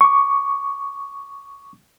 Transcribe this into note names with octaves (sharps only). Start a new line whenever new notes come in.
C#6 D6